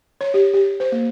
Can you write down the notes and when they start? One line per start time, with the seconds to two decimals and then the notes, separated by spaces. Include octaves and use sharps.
0.21 C#5
0.34 G4
0.53 G4
0.80 C5
0.92 A#3